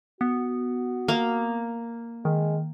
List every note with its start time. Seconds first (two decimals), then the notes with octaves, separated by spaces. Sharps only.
0.21 B3 F#4
1.08 A#3
2.25 D#3 G#3